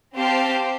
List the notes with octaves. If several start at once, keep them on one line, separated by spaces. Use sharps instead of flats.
C4 G4 C5 F5 A5